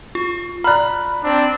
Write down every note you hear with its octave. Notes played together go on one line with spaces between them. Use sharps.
F4
D5 A#5 B5 F6 F#6
C4 D4